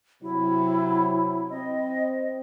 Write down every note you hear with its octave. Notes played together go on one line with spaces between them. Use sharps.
C3 F#3 E4
C4 D#5